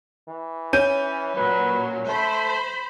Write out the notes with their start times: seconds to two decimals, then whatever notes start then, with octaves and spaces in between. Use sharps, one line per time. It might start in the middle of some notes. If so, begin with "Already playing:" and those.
0.28 E3
0.73 C#4 G6 D#7
1.36 A#2 F#3 B4
2.07 A3 C5 B5